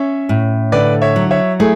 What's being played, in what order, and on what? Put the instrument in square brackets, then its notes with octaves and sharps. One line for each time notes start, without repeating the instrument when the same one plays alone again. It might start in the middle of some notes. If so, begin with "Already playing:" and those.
Already playing: [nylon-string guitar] C#4 [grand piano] C#5 E5
[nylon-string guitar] A2
[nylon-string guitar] D3 [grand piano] B4 D5
[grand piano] C#5 E5
[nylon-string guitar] F#3
[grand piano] C#5 E5
[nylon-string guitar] A3 [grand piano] E4 G#4